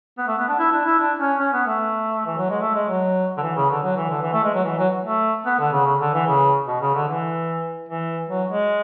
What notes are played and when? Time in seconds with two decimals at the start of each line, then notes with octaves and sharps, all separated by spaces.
0.18 B3
0.28 A3
0.38 B3
0.48 D4
0.59 E4
0.72 D4
0.85 E4
0.99 D4
1.20 C#4
1.40 C#4
1.53 B3
1.67 A3
2.26 E3
2.38 F#3
2.50 G#3
2.61 A3
2.75 G#3
2.89 F#3
3.37 D3
3.43 E3
3.56 C#3
3.70 D3
3.83 F#3
3.96 E3
4.10 D3
4.22 E3
4.34 A3
4.44 G#3
4.54 F#3
4.64 E3
4.78 F#3
5.05 A3
5.46 B3
5.59 D3
5.73 C#3
5.86 C#3
6.01 D3
6.14 E3
6.27 C#3
6.67 B2
6.81 C#3
6.94 D3
7.08 E3
7.89 E3
8.30 F#3
8.51 G#3